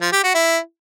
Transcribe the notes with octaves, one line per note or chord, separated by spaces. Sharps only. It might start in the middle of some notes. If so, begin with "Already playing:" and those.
F3
G4
F#4
E4